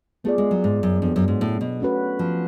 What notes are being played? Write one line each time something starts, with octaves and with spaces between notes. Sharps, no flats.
A3 B3 F4 G#4 D5
G#3
F#3
G#2
F#2
F2 F#3 B3 D4
F#2
G#2
A2
B2
A3 C#4 F#4 B4
F3